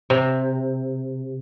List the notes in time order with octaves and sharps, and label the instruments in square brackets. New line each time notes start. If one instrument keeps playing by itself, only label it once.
[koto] C3